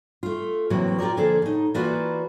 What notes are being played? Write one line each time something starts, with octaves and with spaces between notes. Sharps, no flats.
A3 F4
A2 C3 E3 F#3 A#3
F4 G4 A4 A#4 D5
D3 F3 A#3 G#4 A4
A2 D#4
E3 A#3 F4 F#4 B4 D5